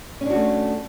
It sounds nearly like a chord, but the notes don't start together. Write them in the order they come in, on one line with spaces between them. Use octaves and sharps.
C#4 D4 F#4 A3